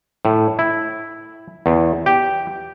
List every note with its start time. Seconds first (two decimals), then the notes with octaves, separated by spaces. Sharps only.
0.25 A2
0.59 E4
1.66 E2
2.06 G4